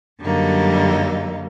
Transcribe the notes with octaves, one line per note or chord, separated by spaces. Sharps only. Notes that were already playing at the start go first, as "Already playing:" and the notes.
F#2 D3 F#3 G3 A#3 D#4